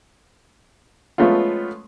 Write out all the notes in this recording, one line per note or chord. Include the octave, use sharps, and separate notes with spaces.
F3 G#3 A3 B3 C#4 F4